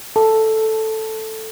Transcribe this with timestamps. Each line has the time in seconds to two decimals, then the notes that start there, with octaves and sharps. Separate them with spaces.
0.16 A4